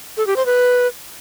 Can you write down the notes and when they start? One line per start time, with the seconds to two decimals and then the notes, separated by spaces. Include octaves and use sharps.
0.17 A4
0.27 G4
0.36 C5
0.46 B4